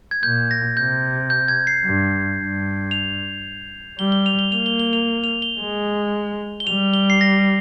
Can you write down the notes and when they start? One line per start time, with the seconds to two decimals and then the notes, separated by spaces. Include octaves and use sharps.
0.11 G#6
0.23 A#2 G6
0.51 A#6
0.77 C3 G6
1.30 G6
1.48 G#6
1.67 C7
1.85 G2
2.39 G2
2.91 F7
3.99 G3 G7
4.12 G7
4.26 F7
4.39 G7
4.52 A#3 F7
4.66 G7
4.80 G7
4.93 F7
5.24 F7
5.42 G7
5.60 G#3
6.60 G7
6.67 G3 F7
6.94 G7
7.10 C7
7.21 A#6